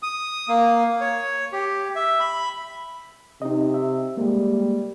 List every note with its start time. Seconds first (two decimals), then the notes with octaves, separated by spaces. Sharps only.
0.03 D#6
0.49 A#3
1.01 C#5
1.53 G4
1.96 E5
2.20 B5
3.42 C3 D#4 D#5
3.74 E5
4.17 G3 G#3 A#3